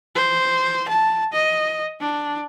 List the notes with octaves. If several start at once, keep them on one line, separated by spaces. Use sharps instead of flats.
C5
A5
D#5
D4